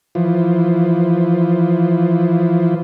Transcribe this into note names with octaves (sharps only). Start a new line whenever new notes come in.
E3 F3